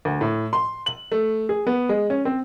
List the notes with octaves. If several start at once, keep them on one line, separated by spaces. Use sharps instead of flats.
D2
A2
C6
F#7
A3
G#4
B3
G#3
C#4
C4